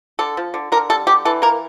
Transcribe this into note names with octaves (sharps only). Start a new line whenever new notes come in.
D3 A4
F3
D3
D3 A#4
G3 A4
D3 G4
E3 A4
A#3 A#4